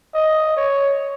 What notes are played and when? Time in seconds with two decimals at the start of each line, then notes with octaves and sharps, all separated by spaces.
0.15 D#5
0.57 C#5